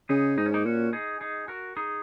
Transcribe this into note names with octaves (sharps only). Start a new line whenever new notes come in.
C#3 D#4 G#4
G#2 D#4
C#4
A#3 D#4
A#2 C#4 F#4
D#4 G#4
D#4 G#4
F#4 A#4
D#4 G#4